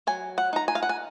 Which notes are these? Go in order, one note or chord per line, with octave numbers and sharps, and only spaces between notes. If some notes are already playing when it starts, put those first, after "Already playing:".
F#3 G#5
F#5
D#4 A#5
G#5
F5
F#5
G#5